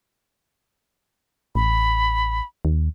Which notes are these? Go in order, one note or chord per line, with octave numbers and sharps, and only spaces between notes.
A1 B5
D#2